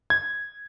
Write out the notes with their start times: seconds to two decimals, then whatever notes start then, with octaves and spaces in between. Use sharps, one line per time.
0.10 G#6